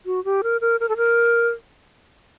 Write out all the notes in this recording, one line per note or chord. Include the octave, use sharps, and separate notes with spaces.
F#4
G4
A#4
A#4
A#4
A4
A#4